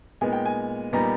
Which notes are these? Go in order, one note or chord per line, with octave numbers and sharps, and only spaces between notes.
A#2 G#3 B3 D#4 G#5
G5
G#5
A#2 G3 B3 D#4 A#5